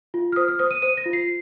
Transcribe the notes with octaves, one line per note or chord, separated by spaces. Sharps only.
F4
F6
C5 D#6
F6
C5 D#6
D#7
C5 D#7
A#6
F4
C7